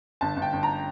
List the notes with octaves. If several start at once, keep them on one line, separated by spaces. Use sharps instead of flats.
G1 A5
G1
G5
G1
A#5